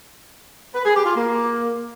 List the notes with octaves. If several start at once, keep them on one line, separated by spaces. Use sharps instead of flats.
B4
G#4
G4
F4
A#3